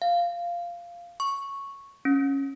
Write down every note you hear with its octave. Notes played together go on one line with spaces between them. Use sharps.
F5
C#6
C#4